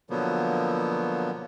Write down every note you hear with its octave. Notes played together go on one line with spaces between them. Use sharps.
B2 D3 F3 F#3 A#3 B3